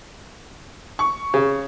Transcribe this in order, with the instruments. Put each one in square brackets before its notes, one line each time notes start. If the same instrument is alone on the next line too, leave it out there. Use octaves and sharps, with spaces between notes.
[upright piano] C#6
[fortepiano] C#3